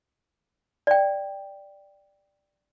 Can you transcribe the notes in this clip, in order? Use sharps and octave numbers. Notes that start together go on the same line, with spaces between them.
D5 G5